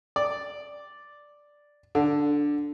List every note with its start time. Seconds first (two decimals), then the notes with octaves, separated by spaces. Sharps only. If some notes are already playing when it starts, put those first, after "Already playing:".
0.16 D5
1.95 D3